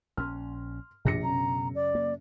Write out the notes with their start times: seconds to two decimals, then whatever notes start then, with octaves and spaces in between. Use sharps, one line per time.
0.17 A#1 C#4 C6 F6
1.05 A#1 B2 D4 A#6 C#7
1.24 F#2 C#3 A#5
1.75 D5
1.95 A#3